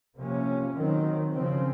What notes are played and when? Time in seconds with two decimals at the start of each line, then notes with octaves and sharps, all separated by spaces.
0.17 C3 F3 A#3 C#4
0.74 D#3 F#3 C4
1.31 C#3 F3 C4